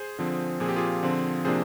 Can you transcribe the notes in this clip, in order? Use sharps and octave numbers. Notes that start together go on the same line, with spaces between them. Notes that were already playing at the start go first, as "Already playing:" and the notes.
Already playing: G#4 C5
D3 F3 C4
A#2 F3 C4 G#4
G4
F4 G#4
D3 F3 C4
C3 F3 A#3 D4 G#4 C5